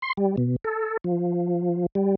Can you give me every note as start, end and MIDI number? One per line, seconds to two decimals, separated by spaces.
0.02 0.13 84
0.17 0.36 55
0.38 0.56 47
0.64 0.97 69
1.04 1.86 53
1.95 2.15 55